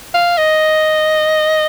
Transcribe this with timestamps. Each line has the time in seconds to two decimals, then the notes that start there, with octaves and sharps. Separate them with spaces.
0.14 F5
0.38 D#5